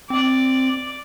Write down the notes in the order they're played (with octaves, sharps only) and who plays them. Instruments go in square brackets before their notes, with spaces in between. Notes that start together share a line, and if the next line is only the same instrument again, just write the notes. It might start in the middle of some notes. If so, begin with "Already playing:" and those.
[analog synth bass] C4 [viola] D5